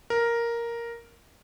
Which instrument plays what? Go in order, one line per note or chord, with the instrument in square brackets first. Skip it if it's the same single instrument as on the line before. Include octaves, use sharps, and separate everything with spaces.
[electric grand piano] A#4